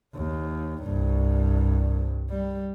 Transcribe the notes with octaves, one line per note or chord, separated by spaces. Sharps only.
D#2
C2 G2
G3